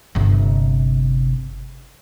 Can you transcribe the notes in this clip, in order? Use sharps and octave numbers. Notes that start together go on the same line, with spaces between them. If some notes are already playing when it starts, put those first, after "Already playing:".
G1 C3